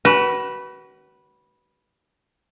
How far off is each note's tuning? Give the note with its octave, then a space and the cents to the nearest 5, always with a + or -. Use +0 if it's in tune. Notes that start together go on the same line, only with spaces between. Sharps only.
F#4 +35 B4 -10